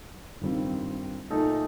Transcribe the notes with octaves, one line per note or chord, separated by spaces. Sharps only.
G2 D#3 G3 C4 F4
A#2 A3 D#4 A4